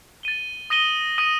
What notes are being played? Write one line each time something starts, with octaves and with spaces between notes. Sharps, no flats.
A6 D#7 G7
D#6 A#6 D#7 G7
D#6 A#6 D#7 G7